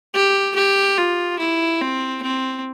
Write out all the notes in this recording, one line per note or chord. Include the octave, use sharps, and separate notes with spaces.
G4
G4
F4
E4
C4
C4